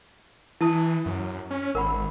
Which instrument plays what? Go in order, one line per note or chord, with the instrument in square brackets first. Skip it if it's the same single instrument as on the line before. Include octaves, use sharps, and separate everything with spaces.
[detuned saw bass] E3 [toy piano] E4 A5 D#6
[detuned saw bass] F#2
C#4
[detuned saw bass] G#1 [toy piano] A#4 F#5 B5